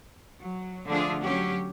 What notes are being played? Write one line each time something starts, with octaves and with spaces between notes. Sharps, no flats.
F#3
D3 F3 A3 D4 F4 G#4
F#3 C#4 G4